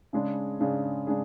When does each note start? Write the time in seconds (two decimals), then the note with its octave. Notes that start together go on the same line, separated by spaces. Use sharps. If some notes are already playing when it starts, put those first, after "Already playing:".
0.13 C#3 G#3 D4 G#4
0.60 C#3 G#3 D4 G#4
1.07 C#3 G#3 D4 G#4